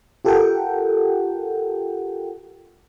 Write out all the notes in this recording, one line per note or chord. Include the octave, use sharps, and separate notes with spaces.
F4 G4 A4 A#4 F#5 G5